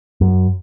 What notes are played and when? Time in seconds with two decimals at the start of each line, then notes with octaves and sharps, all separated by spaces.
0.21 F#2